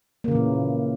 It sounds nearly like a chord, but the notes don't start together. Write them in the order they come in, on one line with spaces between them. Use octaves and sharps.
A#3 C#3 E3 A#2